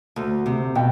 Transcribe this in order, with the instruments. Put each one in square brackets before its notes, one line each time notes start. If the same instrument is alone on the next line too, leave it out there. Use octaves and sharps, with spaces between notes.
[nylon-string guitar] D2
C3
[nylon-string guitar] B2 [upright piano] G5